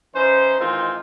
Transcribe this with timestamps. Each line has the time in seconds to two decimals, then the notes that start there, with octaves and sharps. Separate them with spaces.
0.15 E3 C#4 D#4 C5
0.59 D#3 E3 G#3 C4 D#4 F4